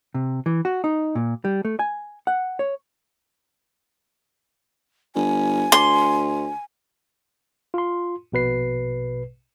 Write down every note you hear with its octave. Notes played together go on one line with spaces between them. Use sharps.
C3
E3
F#4
D#4
A#2
G3
A3
G#5
F#5
C#5
G1 G#5
D2 C6
F4 C6
A#1 B2 B4 C7